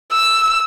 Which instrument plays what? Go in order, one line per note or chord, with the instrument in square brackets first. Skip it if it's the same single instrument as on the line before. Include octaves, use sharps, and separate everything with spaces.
[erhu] E6